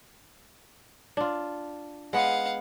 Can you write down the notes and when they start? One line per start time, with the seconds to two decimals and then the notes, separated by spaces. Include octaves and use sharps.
1.17 D4 F4
2.13 G#3 B3 F5 F#5